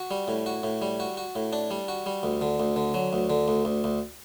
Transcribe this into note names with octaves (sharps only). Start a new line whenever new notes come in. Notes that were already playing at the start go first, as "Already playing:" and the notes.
Already playing: F#4
G3
A2
F#4
A2
G3
F#4
F#4
A2
D4
G3
F#4
G3
D2
D3
D2
D3
F#3
D2
D3
D2
D2
D2